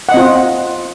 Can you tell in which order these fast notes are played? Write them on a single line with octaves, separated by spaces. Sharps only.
F#5 D#5 C4 F4